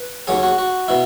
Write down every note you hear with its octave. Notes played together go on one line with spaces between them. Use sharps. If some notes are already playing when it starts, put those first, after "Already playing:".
Already playing: B4
D#2 C#3 F#3 G#4
F#4
F#4
B2 E4